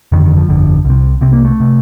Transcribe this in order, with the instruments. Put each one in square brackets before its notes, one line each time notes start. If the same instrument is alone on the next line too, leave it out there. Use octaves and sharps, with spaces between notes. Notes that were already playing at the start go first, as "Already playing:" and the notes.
[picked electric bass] G1 F2 D3 D#3
D#3
F3
G1 F2 D3
C2 C3
C2 C3 C4
A#3
A3
C3